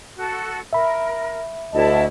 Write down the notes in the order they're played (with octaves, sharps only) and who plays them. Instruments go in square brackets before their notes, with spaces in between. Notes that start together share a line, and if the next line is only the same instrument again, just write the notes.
[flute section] F#4 A4
[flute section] A#4 [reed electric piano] E5 B5
[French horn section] D2 [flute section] E4 A5 [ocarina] D#5